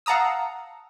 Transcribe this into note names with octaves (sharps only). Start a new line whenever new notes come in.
F5 F#5 A5 A#5 D#6 E6